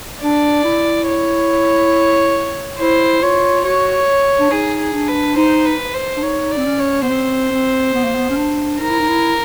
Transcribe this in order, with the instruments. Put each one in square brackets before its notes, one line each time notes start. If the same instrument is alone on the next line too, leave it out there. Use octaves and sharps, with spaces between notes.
[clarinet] D4 [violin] D5
[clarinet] E4
[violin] C#5
[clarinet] E4 [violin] C5
[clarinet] F4 [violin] C#5
[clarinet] F#4 [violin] C#5
[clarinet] D4
[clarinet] D#4 [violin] G#4
[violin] G#4
[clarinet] D4
[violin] B4
[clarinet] D#4 [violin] C5
[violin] B4
C5
[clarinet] D4
[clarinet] D#4 [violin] C#5
[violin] D5
[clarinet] C4
C#4
[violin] C#5
[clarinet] B3
[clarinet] C4 [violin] C5
[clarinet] C4
B3
A#3
B3
C#4
D4
[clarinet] D#4 [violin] A#4
[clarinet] E4
D#4
E4